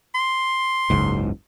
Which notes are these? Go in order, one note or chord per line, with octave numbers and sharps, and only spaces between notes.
C6
F#1 C#2 G#2